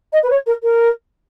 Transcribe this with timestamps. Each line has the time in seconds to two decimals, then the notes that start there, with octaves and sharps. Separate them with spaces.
0.12 D#5
0.23 B4
0.30 C#5
0.46 A#4
0.63 A#4